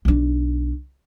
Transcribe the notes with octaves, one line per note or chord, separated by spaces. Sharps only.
B1 D4